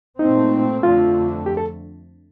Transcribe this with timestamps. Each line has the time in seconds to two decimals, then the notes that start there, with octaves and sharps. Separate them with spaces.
0.19 A#2 A3 C4 D#4
0.83 F2 D3 A3 F4
1.46 G4
1.57 A4